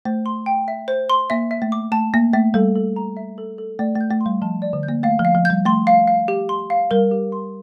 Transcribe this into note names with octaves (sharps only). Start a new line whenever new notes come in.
A3 C5
C6
G5
E5
C5
C6
A#3 E5
E5
A3
D6
A3 A5
A#3 E5
A3 E5
G3 A4
A4
A#5
E5
A4
A4
A3 D5
A3
G6
A3
C6
G3
F3 A5
D5
D3
G6
A#3
A3 F5
F3
F5
F3
G3 G6
A3 C6
F5
F5
G4
C6
F5
G3 A#4
G4
C6